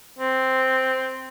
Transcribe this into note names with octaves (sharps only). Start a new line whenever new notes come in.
C4